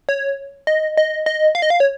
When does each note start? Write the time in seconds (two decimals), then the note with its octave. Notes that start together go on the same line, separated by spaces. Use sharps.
0.09 C#5
0.67 D#5
0.97 D#5
1.26 D#5
1.55 F5
1.62 D#5
1.70 F5
1.80 C#5